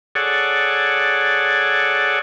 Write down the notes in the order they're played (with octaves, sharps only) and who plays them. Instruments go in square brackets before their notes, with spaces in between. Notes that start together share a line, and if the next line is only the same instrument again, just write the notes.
[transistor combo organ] G#4 A4 C#5 D5 F#5